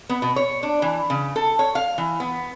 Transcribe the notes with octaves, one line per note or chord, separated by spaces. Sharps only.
B3
B2
C#5
D4
E3
C#3
A4
C#5
F5
E3
B3